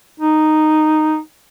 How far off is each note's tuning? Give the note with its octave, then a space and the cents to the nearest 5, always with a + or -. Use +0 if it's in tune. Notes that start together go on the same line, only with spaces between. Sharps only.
D#4 -5